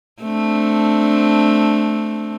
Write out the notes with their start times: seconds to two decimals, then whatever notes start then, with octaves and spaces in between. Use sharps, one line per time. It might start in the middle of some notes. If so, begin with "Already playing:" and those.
0.23 A3 C4 D4